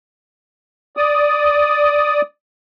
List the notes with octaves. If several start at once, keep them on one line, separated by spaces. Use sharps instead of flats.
D5 D#6